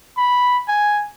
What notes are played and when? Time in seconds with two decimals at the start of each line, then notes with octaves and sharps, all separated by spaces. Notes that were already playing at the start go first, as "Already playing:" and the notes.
0.17 B5
0.68 G#5